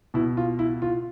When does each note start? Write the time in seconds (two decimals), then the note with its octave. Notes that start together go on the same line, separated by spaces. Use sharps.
0.14 B2 E4
0.37 F4
0.59 E4
0.82 F4